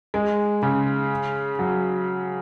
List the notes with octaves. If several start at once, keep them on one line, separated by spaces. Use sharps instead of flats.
G#3
C#3
F#3